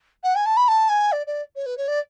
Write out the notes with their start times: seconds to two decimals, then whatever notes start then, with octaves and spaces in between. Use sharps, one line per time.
0.24 F#5
0.35 G#5
0.46 A5
0.57 B5
0.68 A5
0.89 G#5
1.12 D5
1.27 D5
1.56 C#5
1.66 B4
1.77 C#5
1.88 D5